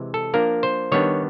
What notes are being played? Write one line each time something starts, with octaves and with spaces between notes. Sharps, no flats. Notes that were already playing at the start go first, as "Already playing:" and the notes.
Already playing: C3 E3 G#3
A4
F3 A#3 D4 A#4
C5
D#3 G3 B3 D4 C#5